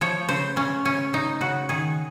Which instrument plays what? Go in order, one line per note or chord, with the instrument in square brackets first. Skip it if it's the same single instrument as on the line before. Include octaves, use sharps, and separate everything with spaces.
[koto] F3 C#5
C#3 C5
C#3 C#4
C#3 C#4
C#3 D#4
C#3 F#4
D#3 G#4